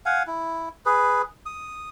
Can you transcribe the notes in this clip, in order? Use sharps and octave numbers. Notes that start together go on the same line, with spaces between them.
F5 F#5 G#5
E4
G#4 B4
D#6